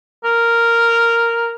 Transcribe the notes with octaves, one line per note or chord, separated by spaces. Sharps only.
A#4